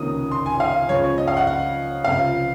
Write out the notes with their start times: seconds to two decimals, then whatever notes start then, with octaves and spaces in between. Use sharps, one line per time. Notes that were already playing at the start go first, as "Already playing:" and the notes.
Already playing: C#2 C3 D#3 A#3 C#4 D#6
0.31 C6
0.46 G#5
0.60 F5
0.89 C#2 C#3 F3 G#3 C#5
1.03 C#5
1.18 D#5
1.28 F5
1.37 F#5
1.47 F#5
2.04 C#2 C3 F3 F5